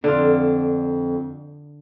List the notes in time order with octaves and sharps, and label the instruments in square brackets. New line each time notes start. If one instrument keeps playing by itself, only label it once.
[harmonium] F2 [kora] D3 F4 [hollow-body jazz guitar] D4